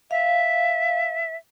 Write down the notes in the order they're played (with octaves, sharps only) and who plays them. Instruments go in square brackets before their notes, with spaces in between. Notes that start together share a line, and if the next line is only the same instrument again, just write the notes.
[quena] E5 [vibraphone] F5